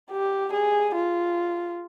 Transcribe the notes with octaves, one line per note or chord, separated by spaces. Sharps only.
G4
G#4
F4